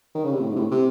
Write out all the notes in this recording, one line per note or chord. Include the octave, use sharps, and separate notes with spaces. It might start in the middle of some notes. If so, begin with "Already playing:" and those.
D#3
C#3
C3
A2
G#2
C3
A2
C3